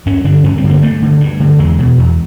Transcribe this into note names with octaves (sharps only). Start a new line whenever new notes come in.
G2 C#4
D3 D4
G2 C#4
C4
D3
A#3
G2 A3
D3
G2
D3
E2 G#3
B2
E2